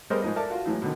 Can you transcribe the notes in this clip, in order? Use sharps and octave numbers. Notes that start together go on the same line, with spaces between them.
G3 B3 G#4 A#4 C5 D#5
G#2 F3 D#4 D#5
A4 A#4 D5 E5 A5
F4 F#4
A2 E3 F#3 G#3
B2 D3 D#3